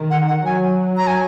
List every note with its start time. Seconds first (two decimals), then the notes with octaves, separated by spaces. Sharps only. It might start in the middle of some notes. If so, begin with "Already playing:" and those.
Already playing: D#3
0.10 F#5
0.28 F#5
0.45 F#3 G#5
0.97 A#5
1.07 G#5